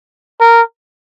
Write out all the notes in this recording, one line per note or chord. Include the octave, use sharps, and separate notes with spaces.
A#4